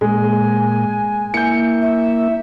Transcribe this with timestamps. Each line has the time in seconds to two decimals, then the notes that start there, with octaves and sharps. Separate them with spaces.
0.01 A#2 G#3 G#5
1.34 A#3 E4 G6 C#7
1.82 E5